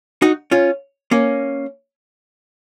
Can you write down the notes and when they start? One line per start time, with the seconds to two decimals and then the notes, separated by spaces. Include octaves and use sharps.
0.22 D#4 F#4
0.51 C#4 F4
1.11 A#3 C#4